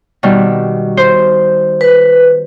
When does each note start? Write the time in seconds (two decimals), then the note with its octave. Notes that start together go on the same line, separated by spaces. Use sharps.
0.23 B2 D#3 G3
0.97 C5
1.81 B4